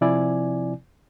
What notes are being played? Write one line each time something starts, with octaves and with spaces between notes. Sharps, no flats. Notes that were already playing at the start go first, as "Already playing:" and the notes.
C3 F3 C4 E4 D5 G#5